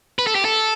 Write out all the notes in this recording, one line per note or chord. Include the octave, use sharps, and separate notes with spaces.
B4
A4
G4
A4